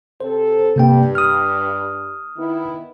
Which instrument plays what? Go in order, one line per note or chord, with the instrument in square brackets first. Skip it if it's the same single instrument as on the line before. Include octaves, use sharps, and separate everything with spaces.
[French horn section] C3 C4 A4 [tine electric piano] C5
[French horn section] G2 [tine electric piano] C3 A#3 G5
[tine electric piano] D#6 F6
[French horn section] D#3 B3 E4